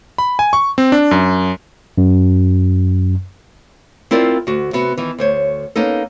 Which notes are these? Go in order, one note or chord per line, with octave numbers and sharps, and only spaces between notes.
B5
G#5
C#6
C4
D4
F#2
F#2
C4 E4 F4 A#4 D5
D2 F#4
C3 B3 F#4
D#3 E3
D2 C5 C#5
A#3 B3 C#4 D#4 A4